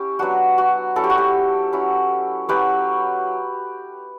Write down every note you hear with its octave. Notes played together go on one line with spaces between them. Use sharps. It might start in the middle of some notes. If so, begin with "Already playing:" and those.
Already playing: C#4 E4 G4
F#3 B3 D4 F#4
F#4
F#3 C#4 E4 A4
G4
F#4
G4
F#3 C#4 E4
F#3 C#4 E4 G4 B4